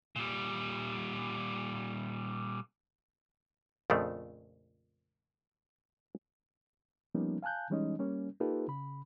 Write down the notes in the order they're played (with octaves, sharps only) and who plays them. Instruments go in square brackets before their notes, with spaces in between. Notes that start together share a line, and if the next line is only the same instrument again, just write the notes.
[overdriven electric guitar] A#2 G3
[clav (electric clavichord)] A#1 F2 C#3 F3 A3
[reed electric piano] F3 G3 A#3 B3 C#4 D#4
F5 G#5 A5 F#6 G6
E3 G3 G#3 C#4 D#4 D#5
G3 A#3 C#4
A#3 D#4 F4 G4 A4 B4
C#3 B5